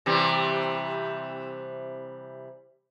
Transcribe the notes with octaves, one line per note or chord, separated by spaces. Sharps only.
C3 E3 G3